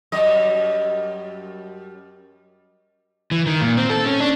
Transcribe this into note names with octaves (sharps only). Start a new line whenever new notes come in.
F#2 G3 D#5
E3
D#3
A#2
C4
A4
C#4
D4